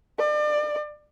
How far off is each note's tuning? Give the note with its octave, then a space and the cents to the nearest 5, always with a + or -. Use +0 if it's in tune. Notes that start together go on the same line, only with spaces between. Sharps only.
D5 +35